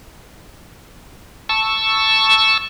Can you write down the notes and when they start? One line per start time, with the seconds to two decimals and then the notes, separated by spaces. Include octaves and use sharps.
1.49 A5 C#6 E6